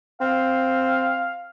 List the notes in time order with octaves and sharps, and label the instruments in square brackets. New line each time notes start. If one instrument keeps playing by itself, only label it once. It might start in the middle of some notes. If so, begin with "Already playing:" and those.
[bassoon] C4 [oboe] F5